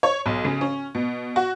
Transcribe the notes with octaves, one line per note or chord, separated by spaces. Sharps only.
C#5
B1
C#3
C#4
B2
F#4